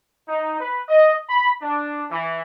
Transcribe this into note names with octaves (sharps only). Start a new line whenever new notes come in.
D#4
B4
D#5
B5
D4
E3